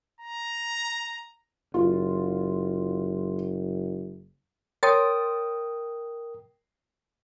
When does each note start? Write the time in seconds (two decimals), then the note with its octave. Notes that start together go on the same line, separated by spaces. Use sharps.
0.21 A#5
1.74 F#1 F4
4.83 A#4 C#5 G5 C6 D#6 A6